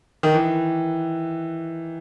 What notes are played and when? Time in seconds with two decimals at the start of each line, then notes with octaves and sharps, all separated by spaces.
0.23 D#3
0.34 E3